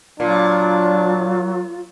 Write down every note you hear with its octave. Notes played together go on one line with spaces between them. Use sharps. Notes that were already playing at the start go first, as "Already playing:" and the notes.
A#2 F#3 D4 F4